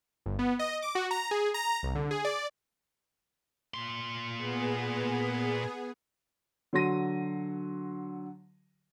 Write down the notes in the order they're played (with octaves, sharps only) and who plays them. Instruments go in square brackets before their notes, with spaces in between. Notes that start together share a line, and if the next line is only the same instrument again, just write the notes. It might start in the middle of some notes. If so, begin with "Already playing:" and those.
[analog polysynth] G1
B3
D#5
D6
F#4
A#5
G#4
A#5
C2
D3
G#4
D5
[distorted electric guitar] A#2 C6
[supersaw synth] B3 G#4
[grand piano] D3 F#3 F#4 C6 A#6 D#7